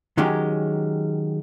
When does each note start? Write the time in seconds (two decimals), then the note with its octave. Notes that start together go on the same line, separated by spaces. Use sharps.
0.18 D#3 F#3 G#3 C#4 G4